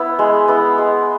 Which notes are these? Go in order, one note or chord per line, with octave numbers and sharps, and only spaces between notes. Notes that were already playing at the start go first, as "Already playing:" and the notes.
Already playing: B3 E4
G#3
B3 E4
G#3